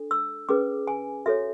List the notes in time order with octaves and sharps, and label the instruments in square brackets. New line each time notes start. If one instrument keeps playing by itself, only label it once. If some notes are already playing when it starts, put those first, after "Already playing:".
Already playing: [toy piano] D4 A4
E6
C#4 G#4 B4 D6
G#5
F#4 A4 C#5 E5